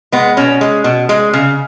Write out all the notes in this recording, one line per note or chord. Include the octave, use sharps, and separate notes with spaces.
G#3 B3
B2 C#4
G#3
B2
G#3
C#3